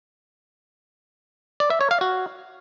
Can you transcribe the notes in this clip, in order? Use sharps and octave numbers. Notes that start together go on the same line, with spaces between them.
D5
E5
C#5
F5
F#4